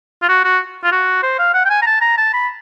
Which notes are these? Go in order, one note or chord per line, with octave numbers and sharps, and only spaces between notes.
F4
F#4
F#4
F4
F#4
C5
F5
F#5
G5
G#5
A#5
A5
A#5
A5
B5